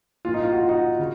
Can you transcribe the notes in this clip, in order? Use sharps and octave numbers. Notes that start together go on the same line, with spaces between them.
A#2 F3 F4
D#4
F4
F#4
F4
D#4 F#4
C#3